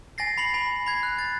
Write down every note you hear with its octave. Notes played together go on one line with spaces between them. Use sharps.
G#5 A6 A#6 C7
B5 C7 C#7 F#7
G#5 B5
B5 G#6 C7
F#6
A6